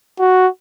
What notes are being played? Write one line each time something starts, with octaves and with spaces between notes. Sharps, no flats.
F#4